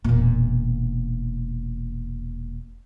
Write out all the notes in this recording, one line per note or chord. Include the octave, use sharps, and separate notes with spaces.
E1 A#2